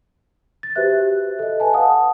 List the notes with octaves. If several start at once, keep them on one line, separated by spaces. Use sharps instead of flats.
A6
F#4 G4 B4 C5 E5 F#6
A4 D#5
B4 G#5 A5
F5 F#5 A5 D#6